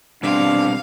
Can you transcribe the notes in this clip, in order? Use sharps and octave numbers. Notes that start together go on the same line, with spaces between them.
B2 G3 C4 D4 F5